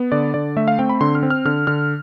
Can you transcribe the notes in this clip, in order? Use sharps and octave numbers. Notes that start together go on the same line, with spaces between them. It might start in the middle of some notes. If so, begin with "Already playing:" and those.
Already playing: B3
D3 D5
D3 D5
A3 E5
F5
C4 G5
B5
D3 C6
F6
C4
F6
D3 F6
D3 F6